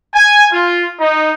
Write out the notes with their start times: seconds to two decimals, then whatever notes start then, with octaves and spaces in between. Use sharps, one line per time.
0.13 G#5
0.52 F4
0.99 D#4